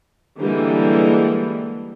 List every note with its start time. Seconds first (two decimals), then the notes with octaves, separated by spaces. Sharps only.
0.39 D3 E3 G3 G#3 A#3